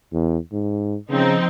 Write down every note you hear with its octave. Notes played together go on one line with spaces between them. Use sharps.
E2
G#2
C#3 F3 C4 D#4